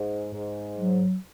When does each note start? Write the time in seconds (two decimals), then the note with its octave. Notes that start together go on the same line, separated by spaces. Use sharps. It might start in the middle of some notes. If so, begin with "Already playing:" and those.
Already playing: G#2
0.33 G#2
0.76 F#3